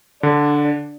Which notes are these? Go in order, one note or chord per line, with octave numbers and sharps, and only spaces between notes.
D3 D4